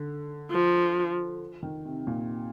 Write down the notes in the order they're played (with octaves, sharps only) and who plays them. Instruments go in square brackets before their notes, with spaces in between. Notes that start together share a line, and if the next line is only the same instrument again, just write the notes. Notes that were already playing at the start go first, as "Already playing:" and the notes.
Already playing: [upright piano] D3
[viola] F3
[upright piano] D#3
C3
A#2